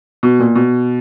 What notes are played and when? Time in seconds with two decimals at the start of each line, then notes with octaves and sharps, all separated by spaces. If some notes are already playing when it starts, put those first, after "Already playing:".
0.23 B2
0.40 A#2
0.55 B2